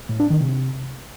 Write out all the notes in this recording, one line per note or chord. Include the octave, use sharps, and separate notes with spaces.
A2
D4
D#3
C3